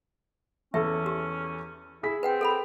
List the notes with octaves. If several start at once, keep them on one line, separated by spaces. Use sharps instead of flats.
E2 C#4 A4 E5
G4
E4 G#4 B6
C4 B4 F#5 G5
A4 F#5 B5